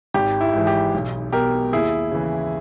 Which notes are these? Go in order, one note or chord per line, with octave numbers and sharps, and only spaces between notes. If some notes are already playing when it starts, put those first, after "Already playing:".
G#1 G4
E4
G#2 E3
G4
B1
B2 G4 A#4
D#2 E4 G#4
C#3 E3